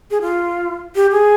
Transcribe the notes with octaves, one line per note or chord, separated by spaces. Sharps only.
G#4
F4
G4
G#4